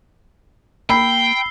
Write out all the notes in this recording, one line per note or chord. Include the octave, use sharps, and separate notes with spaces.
A#3 G5 B5 E6 C7 G7